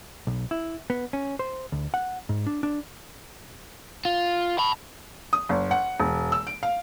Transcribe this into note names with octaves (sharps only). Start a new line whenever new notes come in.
B1
E4
B3
C#4
C5
D2
F#5
G#2
D4
D4
F4
A5 B5
D#6
F#1
F#5
E1
E6
D7
F5